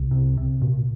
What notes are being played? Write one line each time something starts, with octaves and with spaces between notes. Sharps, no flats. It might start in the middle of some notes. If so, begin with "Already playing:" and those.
Already playing: C2
C3
C3
A#2